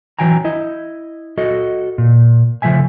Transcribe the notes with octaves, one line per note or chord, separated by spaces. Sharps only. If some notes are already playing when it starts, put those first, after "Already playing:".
E3 F#3 G5 G#5 A#5
E4 D#5
F#4 A4 D#5
A#2
C#3 F3 A3 E5 G#5